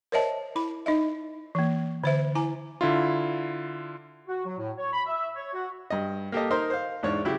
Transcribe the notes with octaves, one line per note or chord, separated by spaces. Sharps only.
A#4 C5 C#5 D#5 E5 A5
E4 B5
D#4 D#5 E5
E3 A#3
D3 C5 E5
E4 G#5 A#5
D3 E4 F4
F#4
F#3
A2
C#5
B5
E5
C#5
F#4
G2 D#5
A#3 G4 A4 D#5
D#4 A#4 C5 C6
C5 F5
E2 G#2 D4 C#5
C#3 F#3 E4 G4